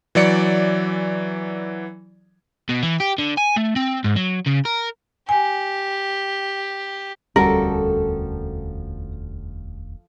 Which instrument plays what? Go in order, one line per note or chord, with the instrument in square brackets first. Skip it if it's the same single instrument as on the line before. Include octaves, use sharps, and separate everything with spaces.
[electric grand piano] E3 F#3 D5 C#7
[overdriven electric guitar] B2
E3
G4
D3
G#5
A3
C4
G#2
F#3
C#3
A#4
[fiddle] G4 [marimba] G#5
[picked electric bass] E1 D2 C#4 [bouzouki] F3 A4 [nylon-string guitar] G3 F#4 [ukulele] A#4